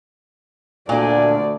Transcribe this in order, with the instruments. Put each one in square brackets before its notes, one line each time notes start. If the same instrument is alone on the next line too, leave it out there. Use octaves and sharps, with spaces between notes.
[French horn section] D2 [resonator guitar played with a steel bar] A#2 D4 [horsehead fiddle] D5 [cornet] G#5